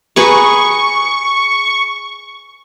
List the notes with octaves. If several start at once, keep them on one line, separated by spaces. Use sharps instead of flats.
G#4 B4 A#5 C#6